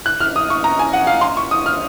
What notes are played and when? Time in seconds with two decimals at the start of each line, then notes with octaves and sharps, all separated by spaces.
0.06 F#6
0.20 F6
0.36 D#6
0.50 C#6
0.64 A#5
0.79 G#5
0.93 F#5
1.07 F5
1.21 C6
1.37 C#6
1.51 D#6
1.66 F6